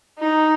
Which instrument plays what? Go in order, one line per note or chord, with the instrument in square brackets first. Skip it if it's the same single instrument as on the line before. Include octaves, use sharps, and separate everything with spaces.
[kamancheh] D#4